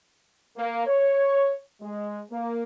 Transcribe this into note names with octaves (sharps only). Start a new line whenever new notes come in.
A#3
C#5
G#3
A#3